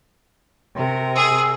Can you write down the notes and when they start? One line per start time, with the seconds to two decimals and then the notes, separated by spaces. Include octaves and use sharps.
0.76 C3 A#4
1.15 G#4 E6